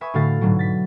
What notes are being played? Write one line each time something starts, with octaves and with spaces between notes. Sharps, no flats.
B4 E5 G#5 C#6 D#6
A2 D3 A3 F#4 F5 A6
G#2 B2 D3 F#3
A6 B6